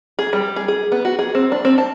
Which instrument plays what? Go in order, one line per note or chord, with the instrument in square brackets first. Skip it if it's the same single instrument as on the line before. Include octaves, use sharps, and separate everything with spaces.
[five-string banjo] G#4
G3
G#4
G#4
B3
F#4
G#4
C4
D4
C4
A5